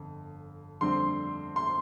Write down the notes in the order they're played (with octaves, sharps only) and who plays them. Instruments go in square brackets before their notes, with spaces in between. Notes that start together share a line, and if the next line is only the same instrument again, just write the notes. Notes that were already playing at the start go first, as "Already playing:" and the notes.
Already playing: [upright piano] G1 F2
F2 D3 G3 C4 C6
C6